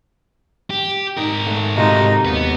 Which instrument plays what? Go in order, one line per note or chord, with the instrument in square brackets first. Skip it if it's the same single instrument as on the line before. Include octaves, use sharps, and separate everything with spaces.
[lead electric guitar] G4
[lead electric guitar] G#2 A#4 [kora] D#4
[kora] A3 F#5
[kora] C3 F4 F#4 [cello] D#4
[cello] D#2 [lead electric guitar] B3 B4